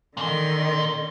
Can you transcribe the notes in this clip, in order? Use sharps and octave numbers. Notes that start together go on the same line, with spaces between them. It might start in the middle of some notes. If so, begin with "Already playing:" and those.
A#2 D3 D#3 C6